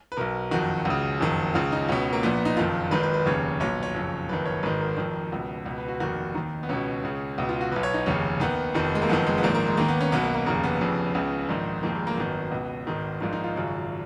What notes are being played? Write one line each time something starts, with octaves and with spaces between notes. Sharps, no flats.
B4
B1 B2 A#4
F#1 F2 D#3 F#4
C#2 C#3
F#1 F2 D#3
C#2 C#3 F4
D#4
C#2 B2 C#4
A#3
A#1 A#2 B3
D#4
F#1 F2 D#3 F4
G#1 G#2 D#3 B4
B4
B4
F1 D#2 C#3 C#5
B1 A#2 C#5
C#5
F#1 F2 C#3
F#1 F2 D#3 B4
C#5
G#1 G#2 D#3 B4
A#4
F1 F2 D#3
C#2 B2
C#2 B2
B4
F#4
F1 D#2 D#3 F#4
D#2 D#3 D#4
B3
C#2 B2 C#4
C#2 C#3
C#2 B2
F4
F#4
B1 B2 B4
C#5
D#4
F1 D#2 C#3 C#4
D#2 D#3 B3
F1 F2 D#3
G#3
A#3
F#1 F2 D#3 B3
G#3
B3
A#1 G#2 D#3 A#3
A#3
G#3
D#2 D#3 A#3
B3
C#4
B1 B2 B3
A#3
A#3
F1 D#2 C#3 A#3
B3
F1 F2 C#3
C#2 C#3
A#1 G#2 D#3
F1 F2 D#3 A#3
G#3
A#3
G#1 F#2 D#3 B3
C#2 B2
G#1 G#2 D#3
A#1 G#2 D#3 F4
D#4
F4
G#1 F#2 C#3